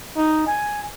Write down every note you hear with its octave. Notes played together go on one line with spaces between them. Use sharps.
D#4
G#5